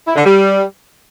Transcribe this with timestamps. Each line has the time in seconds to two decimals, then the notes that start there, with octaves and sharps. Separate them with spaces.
0.07 E4
0.16 D3
0.25 G3